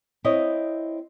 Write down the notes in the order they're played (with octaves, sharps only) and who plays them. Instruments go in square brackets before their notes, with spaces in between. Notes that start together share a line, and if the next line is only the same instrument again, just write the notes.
[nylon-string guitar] C4 E4 C#5 D#5